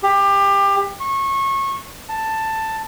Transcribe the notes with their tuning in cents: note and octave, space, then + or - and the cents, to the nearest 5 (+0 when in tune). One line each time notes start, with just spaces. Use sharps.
G4 +25
C#6 -25
A5 +10